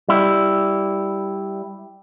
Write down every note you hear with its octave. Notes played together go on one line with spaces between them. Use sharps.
G3 E4